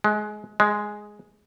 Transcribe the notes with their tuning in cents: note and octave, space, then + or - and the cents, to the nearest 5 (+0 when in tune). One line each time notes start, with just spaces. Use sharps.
G#3 +25
G#3 +5